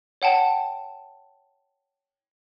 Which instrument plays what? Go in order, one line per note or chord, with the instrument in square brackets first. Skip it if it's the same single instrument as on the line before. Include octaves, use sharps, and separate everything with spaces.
[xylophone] C#5 F#5 G5 A5